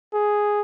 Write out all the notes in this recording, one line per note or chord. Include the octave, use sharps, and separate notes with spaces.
G#4